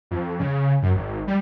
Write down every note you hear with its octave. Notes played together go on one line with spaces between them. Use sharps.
F2
C#3
F#2
G#1
G3